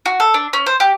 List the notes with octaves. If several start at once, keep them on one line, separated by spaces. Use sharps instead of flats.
F#4
A4
D4
C#4
C5
G4